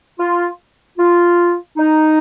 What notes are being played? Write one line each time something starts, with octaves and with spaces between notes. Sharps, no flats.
F4
F4
D#4